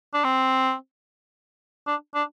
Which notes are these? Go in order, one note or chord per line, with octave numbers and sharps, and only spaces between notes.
D4
C4
D4
D4